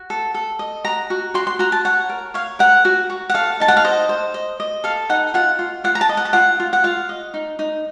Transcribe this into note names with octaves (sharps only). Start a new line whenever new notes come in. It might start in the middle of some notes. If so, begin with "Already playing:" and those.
Already playing: F#4
A4
A4
D#5
F#4 A#5
F#4
F#4 C6
C6
F#4 A#5
A5
C#5 F#5
A#4
C#5 F5
A#4 F#5
F#4
F#4
F#5
A4 F5
D#4 A5
F#5
F5
C5 D#5
C5
D#5
D#5
A4 F5
D#4 F#5
F4 F#5
F4
F4 F#5
A#5
A5
D#5
F#5
A5
F4 F#5
F4
F#5
F4 F5
D#5
D#4
D#4